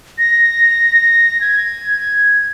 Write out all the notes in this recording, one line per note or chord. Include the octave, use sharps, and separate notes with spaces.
A#6
G#6